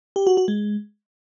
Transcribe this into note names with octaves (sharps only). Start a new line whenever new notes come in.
G4
F#4
F#4
G#3